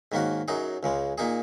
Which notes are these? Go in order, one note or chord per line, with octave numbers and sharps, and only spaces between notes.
G#2 D#3 A#3 C#4 F#4
F#2 F#3 D#4 G#4
C#2 C#3 G#3
A#2 A#3 D#4 G#4